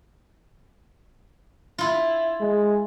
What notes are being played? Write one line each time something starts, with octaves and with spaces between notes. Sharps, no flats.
E4 F4
G#3